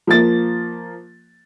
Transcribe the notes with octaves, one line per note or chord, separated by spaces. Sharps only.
F3 A#3 A6